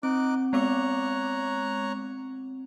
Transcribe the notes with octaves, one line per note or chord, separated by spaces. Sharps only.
C4 D#4 D6 F#6
G#3 B3 C#5 A#5 D6 F#6